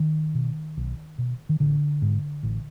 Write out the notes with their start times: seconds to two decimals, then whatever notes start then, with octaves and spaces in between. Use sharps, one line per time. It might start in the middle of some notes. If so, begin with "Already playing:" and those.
Already playing: D#3
0.35 B2
0.77 B1
1.18 B2
1.49 D#3
1.60 A1 D3
2.02 G#2
2.43 A1